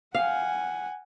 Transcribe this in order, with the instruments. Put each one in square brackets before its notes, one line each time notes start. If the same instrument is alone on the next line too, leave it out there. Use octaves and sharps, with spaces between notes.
[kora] F5 [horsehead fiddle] F#5 G#5